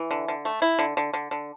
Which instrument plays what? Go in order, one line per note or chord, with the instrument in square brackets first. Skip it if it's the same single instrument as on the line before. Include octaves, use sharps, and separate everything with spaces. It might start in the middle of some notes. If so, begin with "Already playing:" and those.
Already playing: [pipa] E3
D3
D3
A3
E4
D3
D3
D3
D3